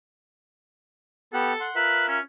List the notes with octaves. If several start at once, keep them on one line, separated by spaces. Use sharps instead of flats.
B3 G4 A4 F#5
F#5 C6
F4 A#4 B4 E5
C#4